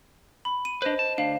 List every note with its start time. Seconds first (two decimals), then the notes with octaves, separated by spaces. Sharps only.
0.45 B5
0.65 D#7
0.82 D4 B4 C5 D#5
0.99 A5
1.18 D2 D4 F5